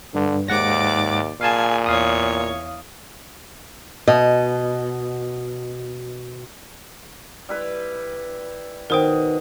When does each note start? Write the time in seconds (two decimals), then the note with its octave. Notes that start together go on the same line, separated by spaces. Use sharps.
0.15 G2 D3
0.48 D#2 G#2 D5 F#5 D6 A#6
1.41 A#2 G#4 F5 G#5 A5
1.86 E2 C#5 F5 D#6
4.08 B2 D#5
7.49 G3 E4 B4
8.90 B2 D#3 A#4 C5 G5 D#6